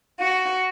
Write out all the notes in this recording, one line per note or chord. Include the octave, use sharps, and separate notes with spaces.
F#4